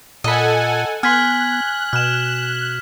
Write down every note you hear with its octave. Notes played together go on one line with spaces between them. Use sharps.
A#2 A4 D#5 F#5 G#5 B5
B3 G#5 C6 F6 F#6 G#6 B6
B2 F6 E7